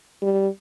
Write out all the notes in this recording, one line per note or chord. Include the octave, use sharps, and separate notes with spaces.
G3